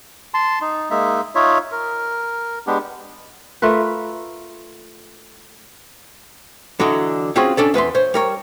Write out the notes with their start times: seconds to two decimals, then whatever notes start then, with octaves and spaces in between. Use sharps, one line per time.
0.34 A5 C6
0.61 D#4
0.91 G#3 A#3 D#4 E5
1.35 D#4 F4 C#5 E5
1.72 A#4
2.67 G#3 B3 D4 G4
3.62 A3 F4 A#4 B4
6.80 D3 E3 F#3 D#5
7.36 C4 C#4 F4 F#4 G#4
7.57 C#4 D4 A4 D5
7.74 E2 B4 E5 C6
7.95 C5 C#5
8.14 G3 A#4 C#5